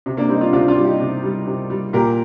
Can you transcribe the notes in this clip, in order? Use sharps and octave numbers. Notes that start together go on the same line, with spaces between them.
C3
A#3 D4
G3 C4 D#4
D4 F4
C3 D4 F4
D4 F4
G3
D#4 G4
C3
G3
C3
G3
A#2 G4 A#4